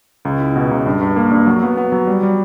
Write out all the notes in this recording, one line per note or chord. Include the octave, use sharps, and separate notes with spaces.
C#2
E4
B2
C#2
G2
G2
A#3
G2
F#3
B3
B3
F#3
G3
G3